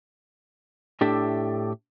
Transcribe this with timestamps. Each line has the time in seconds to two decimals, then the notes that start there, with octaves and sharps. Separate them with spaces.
1.01 A2 D4 G4 A4 E5